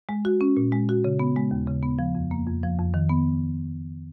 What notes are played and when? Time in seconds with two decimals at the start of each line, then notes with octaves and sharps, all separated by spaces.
0.09 G#3
0.25 F#4
0.41 C#4
0.57 A#2
0.72 G#3
0.89 F#4
1.04 C#3
1.19 B3
1.36 G#3
1.51 D#2
1.67 C#3
1.83 B3
1.99 F3
2.15 F2
2.31 A#3
2.47 F2
2.63 F3
2.79 F2
2.94 D#3
3.09 B3